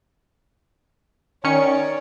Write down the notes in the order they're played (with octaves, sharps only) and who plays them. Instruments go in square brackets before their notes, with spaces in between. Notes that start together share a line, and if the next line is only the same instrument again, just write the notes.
[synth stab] D#3 C#4 C#7 [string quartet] C#5 D5